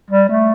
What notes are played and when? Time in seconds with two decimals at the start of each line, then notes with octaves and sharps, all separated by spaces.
0.10 G3
0.29 A3